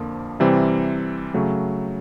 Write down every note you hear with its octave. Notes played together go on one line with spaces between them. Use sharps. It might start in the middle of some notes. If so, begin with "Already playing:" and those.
Already playing: F2 D3 F3 A#3 D4
C3 E3 G3 C4
C#3 F#3 A3